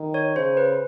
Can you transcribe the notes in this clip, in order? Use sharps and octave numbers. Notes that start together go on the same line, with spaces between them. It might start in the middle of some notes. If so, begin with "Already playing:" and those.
Already playing: D#3
C#5
C#3 C5
B4